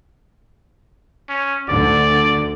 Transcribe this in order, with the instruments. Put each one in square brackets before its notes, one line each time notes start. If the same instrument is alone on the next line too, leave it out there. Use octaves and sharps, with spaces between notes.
[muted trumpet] C#4
[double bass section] D2 D3 [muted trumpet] D5